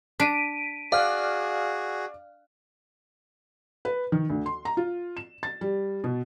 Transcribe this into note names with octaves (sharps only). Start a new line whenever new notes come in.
D4 B6 D7 D#7
F#4 G#4 D5 F5 F6 F#6
B4
D#3
D2
C6
A#5
F4
E7
A6
G3
B2